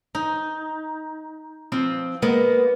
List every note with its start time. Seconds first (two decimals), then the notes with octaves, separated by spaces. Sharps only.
0.15 D#4
1.72 F3 C4 F4
2.22 G#3 A#3 B3